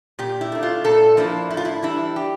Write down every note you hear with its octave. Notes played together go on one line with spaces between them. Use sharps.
A#2 G4
E4
A3 D4
F4
A#2 A4
F3 A#3 D4 E4
A2 E4
F4
E4
E3 G3 D4 E4
G4